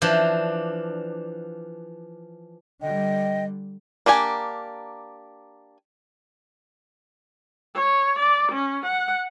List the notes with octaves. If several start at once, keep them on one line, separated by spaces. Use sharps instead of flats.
E3 F3 D4
D3 G3 D#5 G5
A#3 D4 G4 G#5
C#5
D5
C#4
F#5